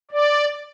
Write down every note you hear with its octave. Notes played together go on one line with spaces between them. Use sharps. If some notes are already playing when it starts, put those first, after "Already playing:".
D5